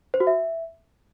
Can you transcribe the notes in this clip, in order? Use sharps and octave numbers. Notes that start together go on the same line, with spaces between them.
C5
F#4
E5